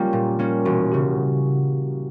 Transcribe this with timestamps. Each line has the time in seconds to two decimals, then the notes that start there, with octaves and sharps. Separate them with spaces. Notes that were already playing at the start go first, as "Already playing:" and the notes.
Already playing: G3 A#3 C#4 F4
0.13 A#2
0.39 G3 A#3 C#4
0.65 E1 F#4
0.92 C#3 G4